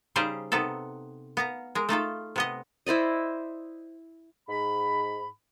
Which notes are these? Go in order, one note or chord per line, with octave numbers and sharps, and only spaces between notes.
C#3 G3 D#4 G4 G#4 C5
C3 B3 D#4 A4
B3 F5 A#5
G#3 A#4
A3 D#4 F4 A4
C3 B3 D#5
E4 C5 D5 D#5
G#2 B5